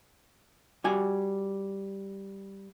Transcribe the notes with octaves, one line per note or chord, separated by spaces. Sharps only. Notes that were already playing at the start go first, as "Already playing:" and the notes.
G3 F#4 G#5